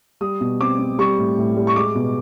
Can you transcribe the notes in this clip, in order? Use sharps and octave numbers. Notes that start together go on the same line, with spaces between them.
G3 D#6
B2
C4 D6
C4
G3 C#6
A2
A2
G3
C#6
G#3 D6
B2